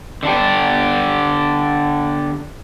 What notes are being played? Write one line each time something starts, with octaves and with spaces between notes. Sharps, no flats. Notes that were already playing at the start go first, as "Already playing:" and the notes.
D3 D4 G4